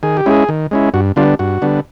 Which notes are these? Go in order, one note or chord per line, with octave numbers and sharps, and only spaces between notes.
D#3 G#4
G4
G#3 C#4 E4 G#4
D#3
G#3 C#4 E4
G2 F#4
D3 G3 B3 D4 F4
G2 F#4
D3 G3 B3 D4